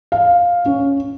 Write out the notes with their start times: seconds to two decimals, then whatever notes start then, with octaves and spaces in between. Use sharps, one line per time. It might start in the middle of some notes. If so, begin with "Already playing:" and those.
0.12 F5
0.66 C#4